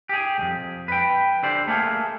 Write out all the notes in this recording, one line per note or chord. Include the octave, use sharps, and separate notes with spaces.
G4 G#4
C2 F2
B4 G5
D3 G4 C5 D5
A3 A#3 G#4